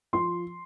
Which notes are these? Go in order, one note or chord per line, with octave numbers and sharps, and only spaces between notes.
F3 C6